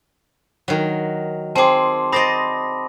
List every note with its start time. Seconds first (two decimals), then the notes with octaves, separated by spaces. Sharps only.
0.68 D#3 F#3
1.56 C4 G#4 A5 C6 D6
2.12 C5 D5 D#5 B5 D#6 A#6